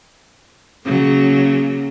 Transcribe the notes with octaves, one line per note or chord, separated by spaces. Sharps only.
C#3 F#3 A#3